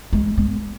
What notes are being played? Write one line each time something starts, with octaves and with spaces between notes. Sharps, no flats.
G#3
G#3